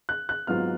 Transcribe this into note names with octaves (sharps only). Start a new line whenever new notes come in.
F#6
F#6
G#1 G#2 F#3 B3 F4 F6